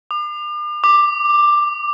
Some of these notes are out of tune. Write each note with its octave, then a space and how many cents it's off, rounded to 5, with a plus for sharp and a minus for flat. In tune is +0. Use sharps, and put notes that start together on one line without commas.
D6 +40
D6 +10